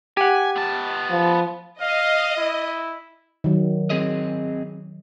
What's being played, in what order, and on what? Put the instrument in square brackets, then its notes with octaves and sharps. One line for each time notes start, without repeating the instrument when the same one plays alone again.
[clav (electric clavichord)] G4 F#5 [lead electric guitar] G#5
[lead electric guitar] B3 A5
[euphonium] F3
[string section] D#5 [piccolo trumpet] F5
[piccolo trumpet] E4
[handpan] D#3 F#3
[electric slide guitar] C4 G#4 D#5